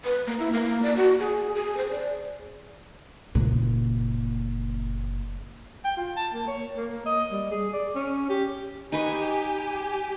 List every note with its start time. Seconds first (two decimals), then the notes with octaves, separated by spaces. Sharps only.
0.05 B4
0.27 A#3
0.39 E4
0.52 A#3
0.83 D5
0.97 F#4
1.19 G#4
1.54 G#4
1.77 C5
1.91 D5
3.35 F#1 A#2
5.85 G5
5.97 F4
6.16 A5
6.34 A#3
6.48 C#5
6.77 A#3
7.06 D#5
7.31 G3
7.51 G#4
7.73 D5
7.95 C#4
8.30 G4
8.92 D#4 G4 B4 G#5 C#6